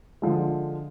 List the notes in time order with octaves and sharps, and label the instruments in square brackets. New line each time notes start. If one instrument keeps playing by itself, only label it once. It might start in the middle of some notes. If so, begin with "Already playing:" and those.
[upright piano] D3 F3 G#3